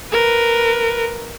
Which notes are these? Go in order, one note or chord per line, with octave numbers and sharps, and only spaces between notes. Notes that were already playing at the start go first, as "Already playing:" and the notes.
A#4 B4